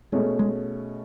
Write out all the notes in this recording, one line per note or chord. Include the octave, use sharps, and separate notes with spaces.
B2 G#3 A3 C#4 G#4
G#3